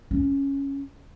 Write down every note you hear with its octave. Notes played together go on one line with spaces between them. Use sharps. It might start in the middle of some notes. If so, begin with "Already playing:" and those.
C#4